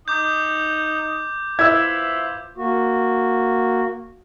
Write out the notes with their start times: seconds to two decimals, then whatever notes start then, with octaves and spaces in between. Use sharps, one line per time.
0.08 D#4 D6 D#6 G6
1.59 E4 F4 B4 C5 E6 G#6
2.57 A#3 F#4